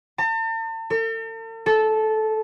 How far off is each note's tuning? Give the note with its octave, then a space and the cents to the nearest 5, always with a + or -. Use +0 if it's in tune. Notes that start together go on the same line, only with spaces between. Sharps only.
A5 +45
A4 +45
A4 -15